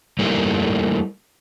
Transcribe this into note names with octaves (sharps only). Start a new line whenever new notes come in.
G3 A3 A#3 D#4 E4 G4